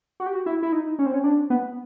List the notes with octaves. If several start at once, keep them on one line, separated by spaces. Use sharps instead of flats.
F#4
G4
F#4
E4
E4
D#4
C#4
C4
C#4
D4
B3